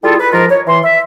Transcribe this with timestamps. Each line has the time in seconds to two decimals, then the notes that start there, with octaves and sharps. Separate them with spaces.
0.04 G3 E4 F4 G#4 A4
0.19 B4
0.32 G#2 F3 F4 A#4
0.50 C#5
0.67 E3 C6
0.83 E5